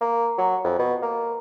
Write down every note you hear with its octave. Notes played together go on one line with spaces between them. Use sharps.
A#3
F#3
F2
B2
A#3